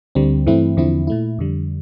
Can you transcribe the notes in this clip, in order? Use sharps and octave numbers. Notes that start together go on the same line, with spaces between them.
D2 D3 G3 C4
G2 E3 A3 C4 E4
E2 D3 F3 C4 E4
A#2 A3 E4
F2 D3 G3